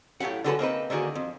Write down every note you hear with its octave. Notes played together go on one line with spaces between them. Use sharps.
A2 F#3 G4 F5 F#5
D3 F#3 G#3 F#4 A4 B4
A#3 C4 D#4 B4
D3 D#3 A#3 F#4 G#4
F2